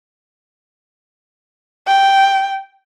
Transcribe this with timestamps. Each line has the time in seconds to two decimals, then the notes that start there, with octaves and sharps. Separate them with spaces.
1.88 G5